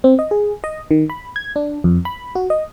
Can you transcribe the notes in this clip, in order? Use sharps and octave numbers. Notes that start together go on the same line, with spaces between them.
C4
D#5
G#4
D#5
D#3
B5
G#6
D4
F2
B5
F#4
D#5